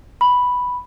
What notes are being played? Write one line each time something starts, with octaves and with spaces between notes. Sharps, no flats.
B5